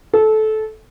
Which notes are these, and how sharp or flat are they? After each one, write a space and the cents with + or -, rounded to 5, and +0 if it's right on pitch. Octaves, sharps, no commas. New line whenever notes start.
A4 -20